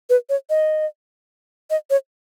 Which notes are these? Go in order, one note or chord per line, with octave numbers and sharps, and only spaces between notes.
B4
C#5
D#5
D#5
C#5